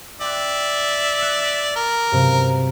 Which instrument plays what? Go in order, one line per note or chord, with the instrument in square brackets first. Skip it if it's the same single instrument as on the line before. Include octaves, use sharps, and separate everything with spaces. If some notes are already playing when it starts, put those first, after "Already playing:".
[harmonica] D5 E5 [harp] G5 C6 F#6
[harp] F#6 C#7 E7
[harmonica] A#4
[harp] G2 C3 F#3